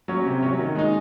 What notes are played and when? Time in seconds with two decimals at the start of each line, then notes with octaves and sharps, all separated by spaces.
0.08 F#3 C#4
0.26 C3
0.42 F#3 C#4
0.59 D#3
0.75 G#3 D#4